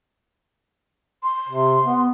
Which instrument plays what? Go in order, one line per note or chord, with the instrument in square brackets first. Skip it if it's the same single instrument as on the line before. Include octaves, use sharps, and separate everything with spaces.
[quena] C6
[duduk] C3
B3